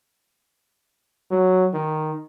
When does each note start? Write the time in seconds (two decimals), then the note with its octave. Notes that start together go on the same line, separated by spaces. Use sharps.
1.31 F#3
1.74 D#3